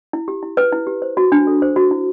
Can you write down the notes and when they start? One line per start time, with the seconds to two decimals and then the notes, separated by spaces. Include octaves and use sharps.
0.13 E4
0.28 G4
0.43 E4
0.57 B4
0.72 E4
0.87 G4
1.02 C5
1.17 F#4
1.32 D4
1.47 A4
1.62 C5
1.76 F#4
1.91 E4